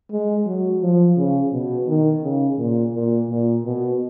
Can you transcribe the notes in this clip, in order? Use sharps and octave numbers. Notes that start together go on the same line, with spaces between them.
G#3
F#3
F3
C#3
B2
D#3
C#3
A#2
A#2
A#2
B2